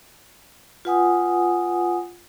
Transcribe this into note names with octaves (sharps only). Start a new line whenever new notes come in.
F4 B4 F#5 G#5 D#6